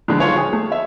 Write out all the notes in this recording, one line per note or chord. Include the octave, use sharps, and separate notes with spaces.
A#1 D3 G#3
D#1 F4 C#5
G#4
A3
E5